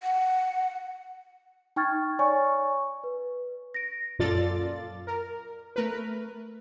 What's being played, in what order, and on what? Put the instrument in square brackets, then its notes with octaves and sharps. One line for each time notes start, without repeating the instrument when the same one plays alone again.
[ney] F#5
[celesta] D#4 G5 C#6 F6 G#6 A6
C#5 D5 G#5 C#6
B4
A#6 D7
[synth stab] F#2 A#2 F4 A4 D5 A6
A#4
A3 A#4 B4